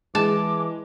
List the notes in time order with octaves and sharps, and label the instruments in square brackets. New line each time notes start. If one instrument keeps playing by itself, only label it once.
[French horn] E3 [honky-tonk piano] G#3 [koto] A5 [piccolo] D6